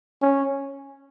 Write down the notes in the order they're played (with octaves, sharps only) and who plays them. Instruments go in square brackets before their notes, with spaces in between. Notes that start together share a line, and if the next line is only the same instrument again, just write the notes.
[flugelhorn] C#4